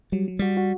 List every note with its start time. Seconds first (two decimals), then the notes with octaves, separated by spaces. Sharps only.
0.12 F#3 G3
0.28 F#3
0.39 G3 F#4
0.57 F#4